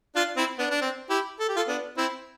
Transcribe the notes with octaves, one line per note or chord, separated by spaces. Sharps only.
D4 F4
C4 E4
B3 D4
D4
C4
E4 G4
A4
G4
F4 A4
B3 D4
C4 E4